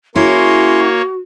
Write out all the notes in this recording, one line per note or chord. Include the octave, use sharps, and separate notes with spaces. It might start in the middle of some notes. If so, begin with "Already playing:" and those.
A#3 C#4 E4 F#4 G#4 C#5 C6